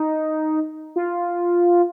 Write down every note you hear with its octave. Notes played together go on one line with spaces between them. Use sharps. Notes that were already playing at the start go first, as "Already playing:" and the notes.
Already playing: D#4
F4